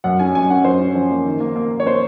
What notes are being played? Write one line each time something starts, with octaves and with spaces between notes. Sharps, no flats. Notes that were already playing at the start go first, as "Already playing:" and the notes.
F#2 F#5
C#4 G#5
F#2 G#5
C#4 F#5
F#2 C5
C#4
F3
A#3
D#3
A#3
A#3
A#3
C#5
A#3 C5